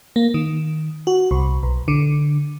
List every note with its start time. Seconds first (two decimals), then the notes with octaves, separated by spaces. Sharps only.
0.16 A#3
0.34 D#3
1.07 F#4
1.31 C2
1.63 B1
1.88 D3